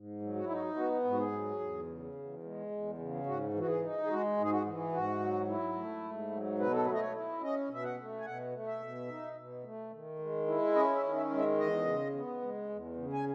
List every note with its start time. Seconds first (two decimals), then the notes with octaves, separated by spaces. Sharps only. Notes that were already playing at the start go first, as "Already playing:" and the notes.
Already playing: G#2
0.21 F#3
0.35 F#4
0.44 E4
0.49 D#4 F#4
0.76 B3 F#4
1.04 G#2
1.10 F#4
1.18 G#4
1.32 F#3
1.60 E2
1.87 C#3
2.14 E2
2.43 G#3
2.71 E2
2.98 C#3
3.26 G#2 F#4
3.54 E3
3.59 F#4
3.68 G#4
3.81 D#4
4.03 G#4
4.10 G#3 F#4
4.37 G#2
4.43 G#4
4.50 F#4
4.65 E3
4.92 G#2 F#4
5.20 F#3
5.48 E4
5.76 A3
6.03 G#2
6.31 F#3
6.59 B2 B4
6.72 A4
6.85 A3 B4
6.93 D#5
7.00 C#5
7.14 E4
7.41 C#4 D#5
7.70 B2 E5
7.83 F#5
7.98 A3
8.20 G#5
8.25 B2 F#5
8.53 A3
8.67 E5
8.81 B2
9.08 D#4
9.36 B2
9.64 A3
9.92 D#3
10.19 G#3
10.47 E4
10.75 C#4 D#5
10.95 E5
11.03 D#3
11.16 E5
11.30 G#3
11.38 E5
11.58 E2 D#5
11.85 C#3
12.14 B3
12.41 G#3
12.69 E2
12.96 C#3
13.13 G#5